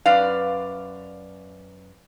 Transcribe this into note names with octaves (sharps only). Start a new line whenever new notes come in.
F#2 B4 D5 F5